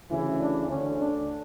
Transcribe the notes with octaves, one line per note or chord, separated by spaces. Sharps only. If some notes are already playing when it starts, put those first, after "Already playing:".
D2 C#3 E3 E4
D4
D2 D3 C#4
D4